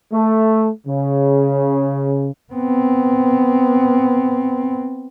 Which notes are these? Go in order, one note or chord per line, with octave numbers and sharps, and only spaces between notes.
A3
C#3
B3 C4